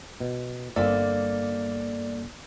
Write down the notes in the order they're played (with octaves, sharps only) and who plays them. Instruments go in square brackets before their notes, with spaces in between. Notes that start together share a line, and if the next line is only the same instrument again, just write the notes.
[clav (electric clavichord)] B2
[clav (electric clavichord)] G1 C4 E5 [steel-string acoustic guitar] A#3 A4 [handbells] D5